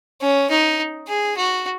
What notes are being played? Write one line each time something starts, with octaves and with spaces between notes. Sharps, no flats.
C#4
D#4
G#4
F#4